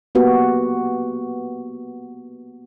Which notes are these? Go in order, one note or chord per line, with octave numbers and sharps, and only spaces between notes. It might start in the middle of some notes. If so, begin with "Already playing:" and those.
A#3 B3 F#4 G4